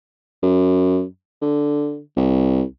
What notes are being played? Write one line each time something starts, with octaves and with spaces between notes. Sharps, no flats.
F#2
D3
C2